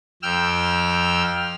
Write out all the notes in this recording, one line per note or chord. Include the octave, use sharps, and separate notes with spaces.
F2 G5 E6 F6